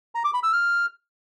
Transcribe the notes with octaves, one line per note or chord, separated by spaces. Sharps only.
A#5
D6
B5
E6
F6